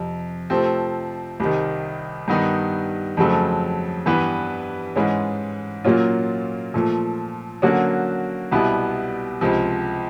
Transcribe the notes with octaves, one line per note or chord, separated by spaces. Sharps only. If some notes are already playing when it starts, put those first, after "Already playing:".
Already playing: F2 C3
C3 F3 A3 C4
C2 C3 D#3
G2 D#3 G3 B3 D#4
F2 C#3 F#3 A3 C4
G2 E3 G3 B3
G#2 E3 G#3 C#4
A#2 F#3 A#3 C#4 F4
A#2 F3 A3
D3 F#3 A#3 C#4 F#4
C2 B2 G3 B3 E4
C#2 C3 F3